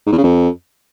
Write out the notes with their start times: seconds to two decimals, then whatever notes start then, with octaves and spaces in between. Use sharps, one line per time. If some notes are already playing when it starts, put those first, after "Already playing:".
0.06 G#2
0.12 E2
0.18 C#3
0.24 F2